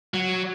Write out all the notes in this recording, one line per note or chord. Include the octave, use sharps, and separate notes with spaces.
F#3